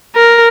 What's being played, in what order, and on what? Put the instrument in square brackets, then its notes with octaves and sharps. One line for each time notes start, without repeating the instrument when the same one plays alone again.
[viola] A#4